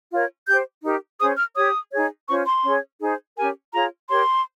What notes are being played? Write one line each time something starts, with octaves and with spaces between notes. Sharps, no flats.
F4 A#4 C#5
G4 G6
C5
D#4 G4 A#4
C#4 G#4 C5 D#6
F6
G4 C#5 D#6
D#4 G#4 C#5
C#4 F4 C5 C#6
C6
C#4 G#4 C#5
D#4 G#4 C5
C#4 G4 A#4 G#5
F4 G#4 C#5 A#5
G4 A#4 C#5 C6